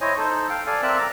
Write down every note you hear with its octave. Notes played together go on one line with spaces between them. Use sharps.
E4 C5 C#5 D#5 G#5
D#4 A4 C5
F5 G5
A4 D5 F5 G#5
C4 A#4 D5 E5 E6 F#6
A#5 D6